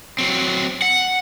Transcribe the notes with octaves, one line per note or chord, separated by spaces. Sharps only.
F#3 C4
F#5